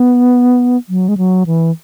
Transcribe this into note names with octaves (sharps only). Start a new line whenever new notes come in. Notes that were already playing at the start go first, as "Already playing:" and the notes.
Already playing: B3
F#3
G#3
F#3
E3